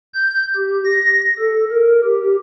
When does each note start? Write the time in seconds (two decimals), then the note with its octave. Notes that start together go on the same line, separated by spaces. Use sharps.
0.14 G6
0.56 G4
0.85 A#6
1.39 A4
1.72 A#4
2.04 G4